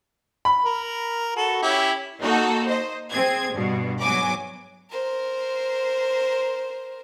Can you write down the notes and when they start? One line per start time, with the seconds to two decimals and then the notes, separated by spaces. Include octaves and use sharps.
0.45 B5
0.64 A#4
1.36 F#4 A4
1.62 C#4 E4 G4
2.20 A#3 D#4 F#4 A4
2.66 C5 D#5
3.10 C4 G#4 G#6
3.53 G2 B2
4.01 G#2 F#3 B3 G#5 D6
4.91 A#4 C5